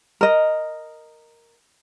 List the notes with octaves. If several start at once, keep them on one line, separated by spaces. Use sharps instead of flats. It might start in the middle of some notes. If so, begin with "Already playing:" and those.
A#4 D#5